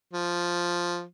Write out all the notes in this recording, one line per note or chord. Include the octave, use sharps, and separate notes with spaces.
F3